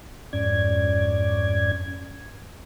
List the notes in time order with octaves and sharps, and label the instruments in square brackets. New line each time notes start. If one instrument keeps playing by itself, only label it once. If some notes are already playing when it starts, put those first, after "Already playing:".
[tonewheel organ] F2 G#2 C#4 D5 G#6